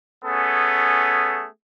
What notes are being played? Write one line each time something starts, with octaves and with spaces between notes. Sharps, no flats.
A3 B3 C#4 G#4 A4